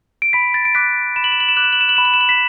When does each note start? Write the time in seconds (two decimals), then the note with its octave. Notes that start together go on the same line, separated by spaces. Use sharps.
0.22 D7
0.33 B5 B6
0.54 A6
0.65 D7
0.75 D6 F#6 B6
1.16 B5 E7
1.24 F#7
1.32 E7
1.40 F#7
1.49 E7
1.57 D6 F#6 F#7
1.64 E7
1.73 F#7
1.81 E7
1.89 F#7
1.97 B5 E7
2.05 F#7
2.14 E7
2.21 F#7
2.29 B6 E7